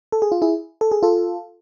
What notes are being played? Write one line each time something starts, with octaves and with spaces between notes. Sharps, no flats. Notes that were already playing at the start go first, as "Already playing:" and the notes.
A4
G#4
F4
E4 G#4
A4
G#4
F4 A4